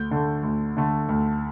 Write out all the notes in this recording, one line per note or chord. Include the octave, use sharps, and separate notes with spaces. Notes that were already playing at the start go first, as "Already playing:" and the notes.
Already playing: D2 G6
D3 A3
D2
D3 A3
D2